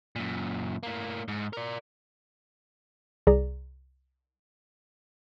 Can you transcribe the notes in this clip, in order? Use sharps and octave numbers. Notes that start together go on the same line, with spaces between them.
F#2 A#2
A2 A#3
G#2
A#4 D5
C2 G#4 D5 A#5